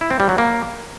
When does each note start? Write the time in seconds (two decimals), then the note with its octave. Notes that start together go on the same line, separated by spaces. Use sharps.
0.01 E4
0.10 C4
0.20 G3
0.29 F#3
0.38 A#3